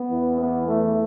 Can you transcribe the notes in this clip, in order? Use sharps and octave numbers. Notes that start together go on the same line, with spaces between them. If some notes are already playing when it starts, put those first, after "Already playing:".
Already playing: B3
E2 E3
B3
A3